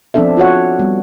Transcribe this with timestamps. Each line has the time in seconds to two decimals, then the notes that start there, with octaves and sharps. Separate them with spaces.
0.14 F3 B3 C4 D4 A4 E5
0.37 F4 F#4 C#5 F#5
0.79 G3 B3